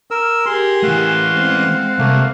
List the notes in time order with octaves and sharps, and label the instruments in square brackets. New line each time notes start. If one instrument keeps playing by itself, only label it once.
[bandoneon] A#4 E6
[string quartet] G4 G#4 A#4 [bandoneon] C6
[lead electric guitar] E3 A3 [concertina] F5 F#5
[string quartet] G#3 C4
[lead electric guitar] C2 [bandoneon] A3 A#3